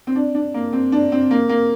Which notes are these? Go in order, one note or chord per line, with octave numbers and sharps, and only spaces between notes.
C4
D4
D4
A#3
C4
D4
C4
A#3
A#3